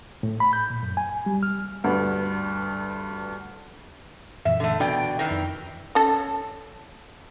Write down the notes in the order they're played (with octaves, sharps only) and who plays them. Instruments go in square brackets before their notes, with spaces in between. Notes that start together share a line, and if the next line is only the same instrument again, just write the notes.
[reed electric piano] A2
B5
G6
A#2
F#2
G#5
G3
F6
[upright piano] D2 G2 B4
[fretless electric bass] F#2 A#2 E3 [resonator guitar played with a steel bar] E5
[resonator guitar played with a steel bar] D3 A3
[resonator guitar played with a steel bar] B2 D5 G5 [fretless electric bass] D4
[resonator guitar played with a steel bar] D#3 E3
[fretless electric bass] F2
[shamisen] C#4 A4